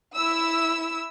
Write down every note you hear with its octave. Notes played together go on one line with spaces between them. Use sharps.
E4 E6